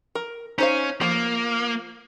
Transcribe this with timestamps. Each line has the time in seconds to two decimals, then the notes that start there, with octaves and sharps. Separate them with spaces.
0.15 A#4
0.58 C#4 D#4 C5 F5
1.01 F3 A#3